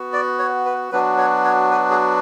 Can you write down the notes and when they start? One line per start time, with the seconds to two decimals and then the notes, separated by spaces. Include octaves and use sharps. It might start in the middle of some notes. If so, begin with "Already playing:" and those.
Already playing: B3 F#4
0.13 D5
0.39 C#5
0.65 B4
0.92 F#3 B3 D4 F#4 B4
1.18 C#5
1.45 C#5
1.71 B4
1.91 G#4